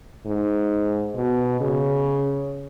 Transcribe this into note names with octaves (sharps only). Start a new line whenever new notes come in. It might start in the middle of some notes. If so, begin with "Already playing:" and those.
G#2
B2
C#3